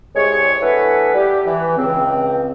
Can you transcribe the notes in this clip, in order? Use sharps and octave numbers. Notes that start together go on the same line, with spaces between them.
C2 G#3 C#5
E3 A3 B3 D4 A4 B4
G3 G4
E3
C#2 C4